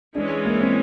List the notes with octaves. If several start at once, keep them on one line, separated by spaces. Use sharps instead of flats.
E3 G#3 C#4 D4
A#3
C4